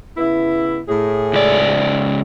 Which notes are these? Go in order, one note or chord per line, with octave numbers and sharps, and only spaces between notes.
C#3 B3 E4
A2 G#4
C#2 D5